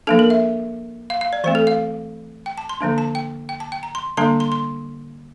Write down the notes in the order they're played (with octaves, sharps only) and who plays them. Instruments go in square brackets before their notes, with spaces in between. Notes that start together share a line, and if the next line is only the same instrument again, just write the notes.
[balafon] F3 A#3 D4 A4
A#4
E5
F5
F5
D5
E3 A3 C4 C5
A4
F5
G5
A5
C6
D3 F3 A#3 D4
A5
G5
G5
A5
G5
A#5
C6
D3 G3 A#3 D4 C6
C6
C6